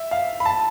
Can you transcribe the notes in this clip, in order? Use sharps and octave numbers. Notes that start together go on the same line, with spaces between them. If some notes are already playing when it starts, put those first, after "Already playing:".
Already playing: E5
F5
B5
A5